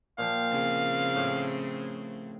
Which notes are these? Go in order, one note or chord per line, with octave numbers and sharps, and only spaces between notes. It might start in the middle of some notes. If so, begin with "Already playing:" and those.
A#2 F3 F5 G5
C#3 C4
A2